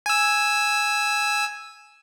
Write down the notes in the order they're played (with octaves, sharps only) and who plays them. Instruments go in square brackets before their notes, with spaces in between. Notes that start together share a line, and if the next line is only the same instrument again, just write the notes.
[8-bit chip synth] G#5 E6